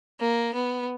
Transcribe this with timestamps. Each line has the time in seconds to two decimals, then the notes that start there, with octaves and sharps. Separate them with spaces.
0.20 A#3
0.54 B3